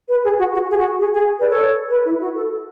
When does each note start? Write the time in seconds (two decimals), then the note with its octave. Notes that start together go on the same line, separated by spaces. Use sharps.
0.09 B4
0.24 G#4
0.39 F#4
0.53 F#4
0.69 G#4
0.79 F#4
0.99 G#4
1.14 G#4
1.39 B4 D5
1.49 A4 C#5
1.90 B4
2.05 E4
2.20 F#4
2.35 A4